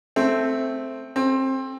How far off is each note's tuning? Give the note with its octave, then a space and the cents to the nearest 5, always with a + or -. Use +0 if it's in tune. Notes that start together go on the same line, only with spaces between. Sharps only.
A3 +0 C4 +0
C4 +20 A4 -30